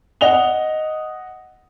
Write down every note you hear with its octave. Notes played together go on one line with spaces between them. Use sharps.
D#5 F#5 F7 G7